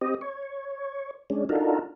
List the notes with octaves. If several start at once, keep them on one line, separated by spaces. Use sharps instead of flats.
C4 G4 D#5
C#5
G#3 C#4 D4
D4 D#4 F4 F#4 A4 A#4